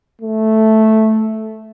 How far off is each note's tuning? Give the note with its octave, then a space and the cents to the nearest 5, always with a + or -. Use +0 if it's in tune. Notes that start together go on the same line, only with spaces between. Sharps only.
A3 -5